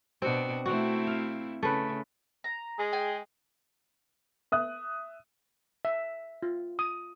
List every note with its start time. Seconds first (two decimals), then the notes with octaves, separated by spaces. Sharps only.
0.22 B2 C4 D4 F#4
0.66 A3 C4 E4 F#4
1.07 F5
1.63 C#3 A3 B4
2.44 A#5
2.79 G#3 G#4
2.93 G5 G#5
4.52 E5 D#6 F#6
5.85 E5
6.43 F4
6.79 D#6